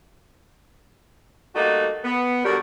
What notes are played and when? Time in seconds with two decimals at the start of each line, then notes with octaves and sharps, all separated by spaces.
1.55 G3 A3 A#3 D#4 F#4
2.03 B3
2.44 B2 D3 F#3 G3 G4 A#4